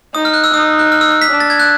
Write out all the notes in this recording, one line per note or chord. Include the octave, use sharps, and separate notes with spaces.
D#4 D#6
F6
F#6
E6
D#4 D#6
F#6
F6
E6
F6
B6
D4
A6
G#6
F#6